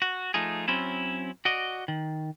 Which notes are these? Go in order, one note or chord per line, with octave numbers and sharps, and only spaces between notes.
F#4
F3 A3 D#4 F4 G#4
F#3 C4 C#4 E4
F#4 D5 D#5
D#3